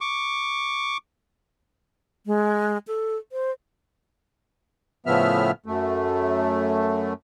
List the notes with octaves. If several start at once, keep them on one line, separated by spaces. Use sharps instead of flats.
C#6 D6
G#3
A4
C5
A2 C#3 F3 B3 E5 F6
F#2 A3